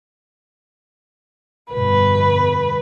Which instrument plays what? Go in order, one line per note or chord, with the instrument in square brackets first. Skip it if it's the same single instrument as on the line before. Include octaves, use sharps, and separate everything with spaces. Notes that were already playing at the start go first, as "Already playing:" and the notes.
[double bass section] G1 F2 B2 [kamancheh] B4